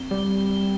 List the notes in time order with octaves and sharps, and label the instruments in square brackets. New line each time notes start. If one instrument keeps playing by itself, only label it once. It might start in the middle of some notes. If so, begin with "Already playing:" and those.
Already playing: [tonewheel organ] C4
[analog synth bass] G3